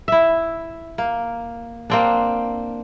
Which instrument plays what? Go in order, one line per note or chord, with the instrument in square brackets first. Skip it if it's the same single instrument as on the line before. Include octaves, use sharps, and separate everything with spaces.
[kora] E4 E5
A#3
A#3 C4 D4